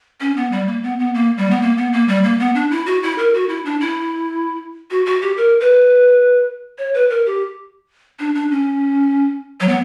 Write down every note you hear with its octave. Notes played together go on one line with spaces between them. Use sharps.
C#4
B3
G3
A#3
B3
B3
A#3
G3
B3
A#3
B3
A#3
G3
A#3
B3
D4
E4
F#4
E4
A#4
F#4
E4
D4
E4
F#4
F#4
G4
A#4
B4
C#5
B4
A#4
G4
D4
D4
C#4
F#3
B3